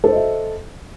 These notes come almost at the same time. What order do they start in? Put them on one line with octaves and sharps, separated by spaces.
A4 C5 D#5 E5